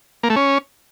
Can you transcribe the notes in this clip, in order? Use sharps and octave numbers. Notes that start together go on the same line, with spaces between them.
A#3
A3
C#4